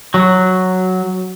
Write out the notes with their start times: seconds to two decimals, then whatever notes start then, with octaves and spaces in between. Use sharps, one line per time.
0.14 F#3